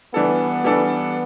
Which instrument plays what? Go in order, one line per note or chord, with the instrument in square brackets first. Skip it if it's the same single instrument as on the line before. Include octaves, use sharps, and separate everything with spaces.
[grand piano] E3 G3 D4 A4 [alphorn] B3
[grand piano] E3 G3 D4 A4